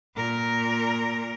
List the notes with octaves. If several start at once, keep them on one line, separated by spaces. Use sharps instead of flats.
A#2 A#4